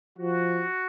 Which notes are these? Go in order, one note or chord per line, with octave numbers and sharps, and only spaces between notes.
F3 F#4